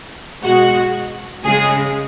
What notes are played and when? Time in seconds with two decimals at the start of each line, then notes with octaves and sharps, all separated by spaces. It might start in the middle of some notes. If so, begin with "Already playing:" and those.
0.43 B2 G#3 F#4
1.44 C#3 G#3 G#4